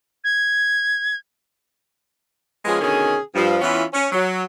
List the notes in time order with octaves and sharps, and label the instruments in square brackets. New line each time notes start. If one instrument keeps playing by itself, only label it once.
[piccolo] G#6
[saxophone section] F3 G#3 B3 C#4 F4 G#4
B2 D3 D#3 C#4 G#4
G2 F3
E3 B3 C#4 E4 F4
C#4
F#3